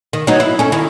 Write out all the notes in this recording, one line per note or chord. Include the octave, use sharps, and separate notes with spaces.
D#3
F#3 B3 D#4
E4
C#4 A4
D#3 E4